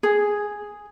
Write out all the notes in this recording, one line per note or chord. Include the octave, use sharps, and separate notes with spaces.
G#4